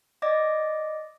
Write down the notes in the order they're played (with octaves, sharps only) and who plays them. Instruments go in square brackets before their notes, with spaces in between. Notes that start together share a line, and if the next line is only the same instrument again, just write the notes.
[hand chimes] D5 D#5 D6 A#6